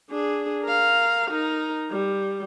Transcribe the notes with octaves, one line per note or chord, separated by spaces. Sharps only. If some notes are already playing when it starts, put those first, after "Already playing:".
D4 G#4
A#4 F5
D#4 A#4
G3